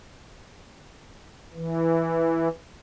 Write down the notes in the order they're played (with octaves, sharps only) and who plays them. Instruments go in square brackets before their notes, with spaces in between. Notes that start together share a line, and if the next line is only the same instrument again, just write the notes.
[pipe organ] E3